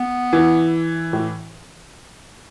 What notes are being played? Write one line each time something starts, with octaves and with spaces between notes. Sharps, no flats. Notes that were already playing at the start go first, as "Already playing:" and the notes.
Already playing: B3
E3
A2